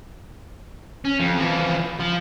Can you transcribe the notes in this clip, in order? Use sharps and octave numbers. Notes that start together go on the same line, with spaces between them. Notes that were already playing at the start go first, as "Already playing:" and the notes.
C#4
F2
E3 F3
F3